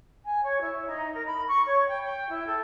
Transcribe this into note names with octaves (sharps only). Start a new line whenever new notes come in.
G#5
C#5
E4
D#4
A#4
B5
C#6
C#5
G5
G5
E4
A4